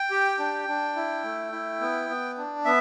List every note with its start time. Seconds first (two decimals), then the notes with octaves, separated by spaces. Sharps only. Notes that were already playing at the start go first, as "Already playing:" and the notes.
Already playing: G5
0.11 G4
0.39 D4
0.68 D4
0.96 E4
1.24 A3
1.52 E4
1.81 B3
2.09 B3
2.38 D4
2.65 B3 E5